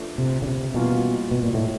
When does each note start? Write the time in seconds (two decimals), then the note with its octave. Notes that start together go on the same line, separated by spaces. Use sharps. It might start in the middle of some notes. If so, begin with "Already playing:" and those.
Already playing: F3 A3 D4 B4
0.18 C3
0.42 C#3
0.46 C3
0.74 B2 E3 G3 A#3 C#4 F4
1.31 B2
1.43 A#2
1.54 A2